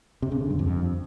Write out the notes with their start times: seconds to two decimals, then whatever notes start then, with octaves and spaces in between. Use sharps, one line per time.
0.22 C3
0.32 C#3
0.41 D3
0.50 G2
0.59 F2